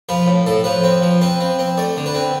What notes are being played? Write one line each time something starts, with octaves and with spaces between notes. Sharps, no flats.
F3 B4
A2
A2 A4
F3 B4
C4
F3
C4 B4
C4
C4
A3 D5
D3
B4
C4